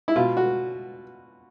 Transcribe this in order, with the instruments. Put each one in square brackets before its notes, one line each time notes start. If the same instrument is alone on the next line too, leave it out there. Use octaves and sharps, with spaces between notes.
[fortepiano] E4
B2 F4
F#4